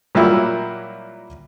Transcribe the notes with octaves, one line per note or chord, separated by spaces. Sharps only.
A#2 F#3 G3 A#3 E4